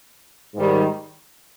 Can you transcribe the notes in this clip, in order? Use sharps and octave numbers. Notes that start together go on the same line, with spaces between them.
G#2 D#3 G3